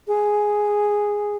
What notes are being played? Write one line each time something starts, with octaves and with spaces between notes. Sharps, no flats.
G#4